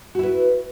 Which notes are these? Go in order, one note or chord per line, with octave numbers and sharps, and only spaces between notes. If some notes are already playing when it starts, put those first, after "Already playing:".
E4 F#4 B4